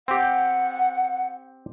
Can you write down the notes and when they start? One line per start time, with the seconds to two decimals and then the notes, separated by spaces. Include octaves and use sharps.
0.08 C4 G4 F#5